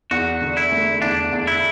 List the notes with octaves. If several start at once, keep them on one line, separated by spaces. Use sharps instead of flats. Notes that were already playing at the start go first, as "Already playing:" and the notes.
E2 F#4
D3
E4
A3
E2 D4
E2
E4